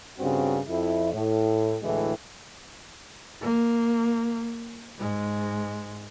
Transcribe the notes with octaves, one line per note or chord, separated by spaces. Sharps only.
G2 C#3 C4 F#4
F2 E4
A2
D2 A2 E3 G#3
A#3
G#2 G#3